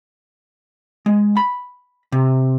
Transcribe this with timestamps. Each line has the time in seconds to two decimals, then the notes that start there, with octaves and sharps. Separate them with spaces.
1.06 G#3
1.37 B5
2.12 C3